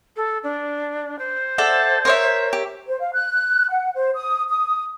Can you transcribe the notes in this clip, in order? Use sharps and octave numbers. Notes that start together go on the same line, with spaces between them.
A4
D4
C5
A4 D5 E5 F#5
A#4 C#5 E5 C6
G4
C5
F5
F#6
F#5
C5
D#6
D#6